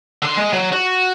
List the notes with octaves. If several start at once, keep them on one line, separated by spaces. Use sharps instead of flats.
D3 C6
G#3
F#3
F#4